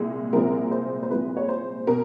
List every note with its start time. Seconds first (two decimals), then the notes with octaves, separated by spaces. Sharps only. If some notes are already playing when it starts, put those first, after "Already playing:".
Already playing: C2 A#2 G#3
0.33 C2 A#2 F3 G#3 A#4
0.71 C5
1.03 C5
1.10 C2 A#2 F3 G#3 B4
1.37 C#5
1.49 C5
1.87 B2 A#4